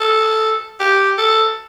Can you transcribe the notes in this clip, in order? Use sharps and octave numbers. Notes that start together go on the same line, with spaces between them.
A4
G4
A4